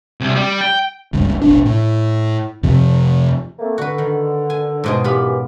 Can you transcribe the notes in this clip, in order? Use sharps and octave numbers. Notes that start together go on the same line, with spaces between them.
C2
G3
G5
F#1 C#2 G2
E1 A1 D4
A2
F2 C3 F3
A3 A#3 C4
D3 F#4 B4
D#3
G#5
G#2 B2 F3 G#3 G#4
F#2 E3 B3 F4 G4 B5